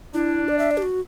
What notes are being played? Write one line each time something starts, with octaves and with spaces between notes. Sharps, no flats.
D4 E4
D5
E5
D5
G4
F#4